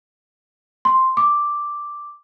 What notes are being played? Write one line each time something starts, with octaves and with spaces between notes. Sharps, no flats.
C6
D6